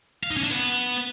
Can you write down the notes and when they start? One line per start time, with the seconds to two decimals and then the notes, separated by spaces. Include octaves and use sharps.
0.23 F5
0.30 D#4
0.37 C#4
0.44 D4
0.50 B3